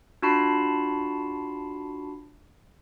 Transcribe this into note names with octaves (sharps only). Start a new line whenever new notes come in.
D4 F4 F#4 A5 B5 C7